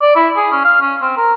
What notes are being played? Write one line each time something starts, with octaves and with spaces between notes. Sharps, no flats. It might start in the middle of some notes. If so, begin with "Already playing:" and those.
D5
E4
G#4
C#4
F5
C#4
C4
A#4